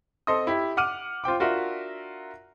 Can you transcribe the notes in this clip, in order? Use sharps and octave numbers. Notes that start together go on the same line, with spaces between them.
C4 A4 D#5 C6 D#6
E4 G4
F#5 D6 F6 D#7
F4 C5 G5 D6
D4 F4 F#4 A#4 E5